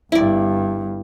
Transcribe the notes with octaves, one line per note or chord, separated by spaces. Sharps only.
G1 G2 E4 D5